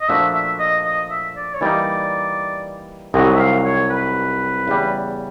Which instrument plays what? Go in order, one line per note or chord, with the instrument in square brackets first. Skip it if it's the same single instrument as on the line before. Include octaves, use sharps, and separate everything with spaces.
[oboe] D#5
[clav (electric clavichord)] A#2 F3 A3 D4 F#4 [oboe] E5
[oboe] E5
D#5
D#5
E5
D5
C#5
[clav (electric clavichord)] E3 G3 A#3 D#4 [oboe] D5
[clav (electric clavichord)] C2 C3 D#3 F#3 [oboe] D#5
[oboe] E5
F5
C#5
B4
[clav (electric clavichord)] E2 C#3 E3 G3